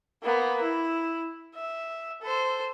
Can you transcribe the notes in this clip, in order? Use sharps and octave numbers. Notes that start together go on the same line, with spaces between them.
A#3 B3
E4
E5
A4 C5